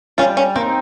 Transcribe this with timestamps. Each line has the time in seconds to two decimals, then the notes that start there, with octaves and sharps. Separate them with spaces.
0.18 G3 C#4 F4
0.37 C#4
0.56 A#3 C4 D#4